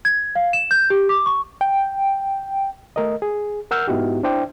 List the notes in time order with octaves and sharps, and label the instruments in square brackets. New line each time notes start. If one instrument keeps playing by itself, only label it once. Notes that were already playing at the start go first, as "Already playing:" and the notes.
[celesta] G#6
F5
E7
G6
G4
D6
C#6
[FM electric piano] G5
[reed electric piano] A3 A#4 D#5
G#4
A#4 F#5 E6 F6 G6
G#2 B3 D#4 E4 F#4 G4
D4 E4 C5 D5 G5